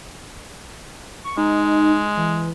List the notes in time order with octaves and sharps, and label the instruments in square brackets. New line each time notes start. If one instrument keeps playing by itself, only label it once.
[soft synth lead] C#6
[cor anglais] G#3 [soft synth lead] D#4
[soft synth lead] E3